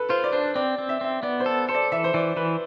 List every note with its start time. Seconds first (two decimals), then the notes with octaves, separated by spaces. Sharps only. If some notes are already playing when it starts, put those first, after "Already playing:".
Already playing: A4 B4
0.09 F4 C5
0.24 D5
0.32 D4 C5
0.55 C4 D5
0.78 C4
0.89 E5
1.01 C4 E5
1.23 B3 D5
1.40 C5
1.46 A4
1.69 A4 C5
1.75 D5
1.92 E3 E5
2.04 C5
2.14 E3 D5
2.36 E3 B4